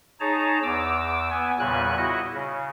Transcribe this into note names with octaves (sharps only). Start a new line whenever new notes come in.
D#4 G#4 C#5 A5 A#5
E2 D6 E6
B3 G#5
E2 A#2 C#3 G3 G#5 F#6
E4 F#4 D#5
C#3